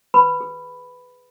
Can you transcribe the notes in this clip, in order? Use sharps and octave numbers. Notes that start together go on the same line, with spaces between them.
B4 B5
G#4